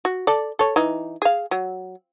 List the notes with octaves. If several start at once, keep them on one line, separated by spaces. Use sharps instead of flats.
F#4
A4 D5
A4 C#5
E3 D#4
G#4 F5
F#3